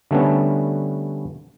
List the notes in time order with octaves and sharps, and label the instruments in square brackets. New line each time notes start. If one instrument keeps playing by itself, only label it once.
[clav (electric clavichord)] D3 G3 A3 B3 C#4 D4